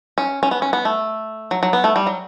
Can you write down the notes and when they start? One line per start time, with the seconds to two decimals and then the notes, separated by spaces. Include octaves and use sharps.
0.18 C#4
0.43 C#4
0.51 B3
0.62 C#4
0.73 B3
0.85 A3
1.51 F#3
1.63 F#3
1.73 B3
1.84 A3
1.96 G3
2.07 F#3